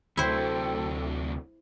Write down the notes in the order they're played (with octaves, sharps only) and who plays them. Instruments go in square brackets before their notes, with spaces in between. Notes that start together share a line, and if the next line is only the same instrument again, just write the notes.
[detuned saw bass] D2 [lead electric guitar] C3 F#3 [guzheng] E4 C5 [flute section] A4 G5